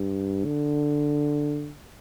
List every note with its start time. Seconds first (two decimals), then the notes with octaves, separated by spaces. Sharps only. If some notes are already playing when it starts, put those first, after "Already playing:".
Already playing: G2
0.45 D3